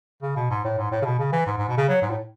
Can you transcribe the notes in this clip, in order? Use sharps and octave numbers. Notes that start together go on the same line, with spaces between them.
C#3
B2
G#2
A2
G#2
A2
C#3
B2
C#3
E3
G#2
G#2
B2
C#3
F#3
G#2
A2